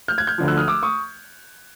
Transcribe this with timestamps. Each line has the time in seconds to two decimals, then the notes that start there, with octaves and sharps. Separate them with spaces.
0.08 F6 G6
0.18 F#6 G#6
0.27 F6 G6
0.38 D2 D3 F3
0.48 E6 F#6
0.58 D#6 F6
0.68 D6 E6
0.83 C#6 D#6